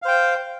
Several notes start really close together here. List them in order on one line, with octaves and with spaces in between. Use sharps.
F5 C5 G5